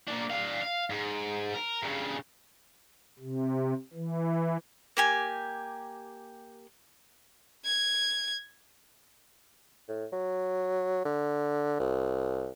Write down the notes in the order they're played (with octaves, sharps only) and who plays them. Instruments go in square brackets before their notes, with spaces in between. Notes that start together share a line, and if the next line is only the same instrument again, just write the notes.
[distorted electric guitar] A#3 D4
D4 F5
F5
G#2
A#4
G2 C#3
[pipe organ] C3
E3
[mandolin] A#3 G4 G#5
[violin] G#6
[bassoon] A2
F#3
D3
C2